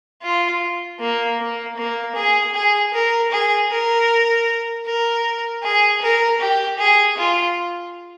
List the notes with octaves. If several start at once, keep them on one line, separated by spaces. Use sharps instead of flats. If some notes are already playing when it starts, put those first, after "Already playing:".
F4
A#3
A#3
A#3
G#4
G#4
A#4
G#4
A#4
A#4
G#4
A#4
G4
G#4
F4